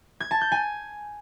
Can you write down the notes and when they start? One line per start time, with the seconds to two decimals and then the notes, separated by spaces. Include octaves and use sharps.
0.20 G#6
0.31 A5
0.41 G6
0.52 G#5